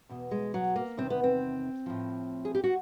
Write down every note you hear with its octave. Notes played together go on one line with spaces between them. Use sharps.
E2 B2
G#3
F#3
A#3
E2 C3 D#3 C4
B3
C4
A2 F3
G#4
G4
F#4